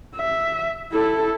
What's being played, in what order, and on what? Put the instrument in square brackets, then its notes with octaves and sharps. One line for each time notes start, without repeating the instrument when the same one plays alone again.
[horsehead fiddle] E5
E4 A4